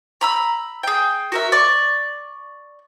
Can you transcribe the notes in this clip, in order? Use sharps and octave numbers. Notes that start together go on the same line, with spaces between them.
A#5 B5 E6
G#4 G5
F#4 A#4 E5
D5 C#6